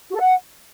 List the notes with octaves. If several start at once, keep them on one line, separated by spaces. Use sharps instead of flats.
F#4
A4
F#5